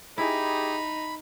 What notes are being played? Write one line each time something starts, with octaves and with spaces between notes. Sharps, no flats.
D#4 E4 G4 G#4 B5